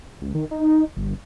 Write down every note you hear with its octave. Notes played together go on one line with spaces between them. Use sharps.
C#2
D#3
D#4
G1